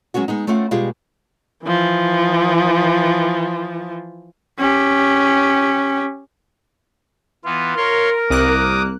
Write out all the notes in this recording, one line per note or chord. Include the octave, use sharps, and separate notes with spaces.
F#3 G#3 B3 C#4 F#4
G#3 B3 D#4
A3 C4 C#4 F4 F#5
B2 G3 G#3 F4 G4 G#4
E3 F3
C#4 G4
E3 B3 F4
A#4 C#5 C6
C2 A#3 D6 D#6 F#6